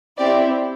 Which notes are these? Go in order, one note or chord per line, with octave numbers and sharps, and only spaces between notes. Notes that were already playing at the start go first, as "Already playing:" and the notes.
C4 E4 G4 D5